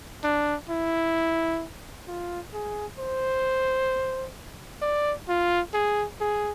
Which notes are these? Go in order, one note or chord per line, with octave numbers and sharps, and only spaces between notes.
D4
E4
F4
G#4
C5
D5
F4
G#4
G#4